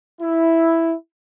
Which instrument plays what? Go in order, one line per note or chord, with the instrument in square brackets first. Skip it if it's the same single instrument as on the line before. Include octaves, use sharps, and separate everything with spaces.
[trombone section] E4